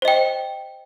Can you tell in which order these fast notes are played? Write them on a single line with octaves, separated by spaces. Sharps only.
C5 D#5 G5